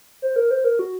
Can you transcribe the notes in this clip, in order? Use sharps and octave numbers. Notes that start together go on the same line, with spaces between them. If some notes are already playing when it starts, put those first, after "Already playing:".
C5
A#4
C5
A#4
F#4